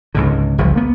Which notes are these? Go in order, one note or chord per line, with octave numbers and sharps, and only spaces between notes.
C#2 G#2 D3
G1 C#2 F3
A#3 B3